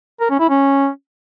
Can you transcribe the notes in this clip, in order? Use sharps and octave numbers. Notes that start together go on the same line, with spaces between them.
A#4
C#4
E4
C#4